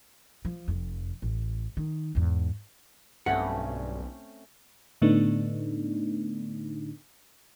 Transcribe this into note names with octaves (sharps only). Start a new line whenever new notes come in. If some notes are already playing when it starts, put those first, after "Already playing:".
F3
F1 F2
A1
D#3
E2 G#2
B1 G2 A3 C4 C#4 F#5
A2 D3 A3 B3 D4 D#4